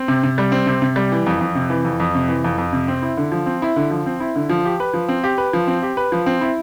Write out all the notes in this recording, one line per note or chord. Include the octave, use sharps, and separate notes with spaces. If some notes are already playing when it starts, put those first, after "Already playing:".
Already playing: C4
C3
C3
G3
C4
C3
C3
G3
E3
F2
F2
C3
E3
F2
F2
C3
E3
F2
F2
C3
C4
E4
D3
F3
C4
E4
D3
F3
C4
E4
D3
F3
G4
B4
F3
C4
G4
B4
F3
C4
G4
B4
F3
C4
E4